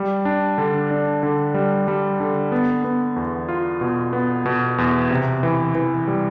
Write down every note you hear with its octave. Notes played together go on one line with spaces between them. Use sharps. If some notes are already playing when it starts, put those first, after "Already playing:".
Already playing: G3
D4
D3
D4
D3
G3
G3
D3
B3
B3
E2
F4
B2
B3
B2
E2
C3
E3
E3
G3